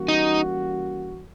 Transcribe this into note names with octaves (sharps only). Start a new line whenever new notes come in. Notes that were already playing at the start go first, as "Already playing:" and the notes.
Already playing: E3 G3 A#3 C#4 F#4
D#4